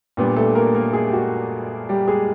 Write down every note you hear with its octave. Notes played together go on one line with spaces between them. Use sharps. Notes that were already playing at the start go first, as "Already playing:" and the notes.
A#2 G3 B3 D4
A3 A4
A#3 A#4
A#3 A#4
G#3 G#4
G4
F#4
G3 G4
G#3 G#4